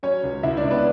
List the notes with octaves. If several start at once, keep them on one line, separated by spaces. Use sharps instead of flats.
F#3 C#4 C#5
C#2
C#2 E4 E5
D4 D5
C#2
B3 B4